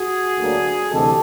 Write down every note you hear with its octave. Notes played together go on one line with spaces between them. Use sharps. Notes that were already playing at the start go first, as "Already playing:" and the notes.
Already playing: F#4 G#4
D2 D3 F#3 A#3 D4
D2 C3 E3 G#3 G4 A4